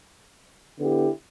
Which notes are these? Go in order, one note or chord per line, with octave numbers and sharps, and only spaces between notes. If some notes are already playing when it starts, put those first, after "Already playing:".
D3 B3 E4 G4